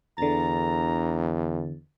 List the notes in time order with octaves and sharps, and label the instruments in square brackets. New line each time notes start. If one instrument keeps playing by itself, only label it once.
[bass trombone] E2 [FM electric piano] D3 A6 [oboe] A#5